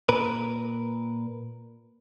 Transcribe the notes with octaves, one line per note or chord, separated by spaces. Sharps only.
A#2 A#4 B4